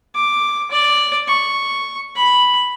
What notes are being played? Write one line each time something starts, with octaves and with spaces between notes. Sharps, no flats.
D6
D5
C#6
B5